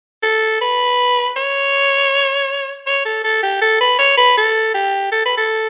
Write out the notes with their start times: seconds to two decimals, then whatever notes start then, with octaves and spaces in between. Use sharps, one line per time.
0.23 A4
0.61 B4
1.36 C#5
2.87 C#5
3.05 A4
3.24 A4
3.43 G4
3.62 A4
3.81 B4
3.99 C#5
4.18 B4
4.37 A4
4.74 G4
5.12 A4
5.26 B4
5.38 A4